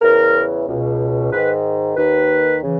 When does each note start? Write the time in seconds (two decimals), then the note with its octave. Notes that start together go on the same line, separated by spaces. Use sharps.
0.01 E2 C#3 E3 A#4
0.66 C#2 B2
1.31 G#2 D#3 B4
1.97 D#2 D#3 B4
2.63 C#3 E3